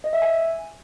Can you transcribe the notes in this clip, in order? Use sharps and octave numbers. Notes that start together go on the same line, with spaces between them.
D#5
E5
G#5